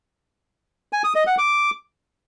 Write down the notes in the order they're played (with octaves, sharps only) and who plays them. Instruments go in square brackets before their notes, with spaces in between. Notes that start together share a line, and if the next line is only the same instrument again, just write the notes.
[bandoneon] G#5
D#6
D#5
F#5
D6